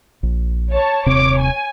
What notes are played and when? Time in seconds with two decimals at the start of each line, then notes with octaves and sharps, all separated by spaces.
0.23 A#1
0.71 C#5 A5
1.06 D#1 C3 C4 C#5 D6
1.39 G#5